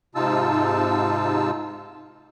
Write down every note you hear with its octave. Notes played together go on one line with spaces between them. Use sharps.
G#2 C3 D#4 F4 A5 E6